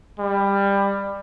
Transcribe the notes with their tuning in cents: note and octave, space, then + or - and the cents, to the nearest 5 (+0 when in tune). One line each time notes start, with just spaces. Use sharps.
G3 +20